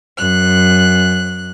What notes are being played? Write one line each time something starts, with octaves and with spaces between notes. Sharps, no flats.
F#2 F#6